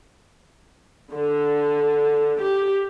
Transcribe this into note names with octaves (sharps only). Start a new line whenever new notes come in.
D3
G4